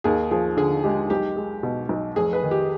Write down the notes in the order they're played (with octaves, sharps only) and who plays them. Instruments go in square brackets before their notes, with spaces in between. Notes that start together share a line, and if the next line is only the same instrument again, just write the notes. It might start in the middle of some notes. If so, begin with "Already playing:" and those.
[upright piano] D#2 G#4
F3 G#4
D3 G#4
G#3 G4
B1 G4
G#3
B2
B1
F1 G#4
B4
D#3
G4